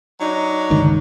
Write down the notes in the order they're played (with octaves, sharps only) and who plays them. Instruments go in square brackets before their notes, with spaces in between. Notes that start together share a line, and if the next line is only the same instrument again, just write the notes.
[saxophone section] F#3 D4 D#4
[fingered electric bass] G1 C#2 D#3